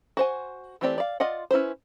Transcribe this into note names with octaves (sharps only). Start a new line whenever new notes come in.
F#4 C5 G#5
E3 A3 C4 G4 D5
D5 F5
F4 D5 D#5 F#5
C#4 E4 B4 C5